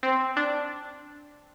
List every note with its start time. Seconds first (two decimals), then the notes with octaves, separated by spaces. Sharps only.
0.03 C4
0.37 D4